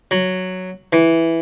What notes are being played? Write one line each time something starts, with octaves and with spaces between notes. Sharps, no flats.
F#3
E3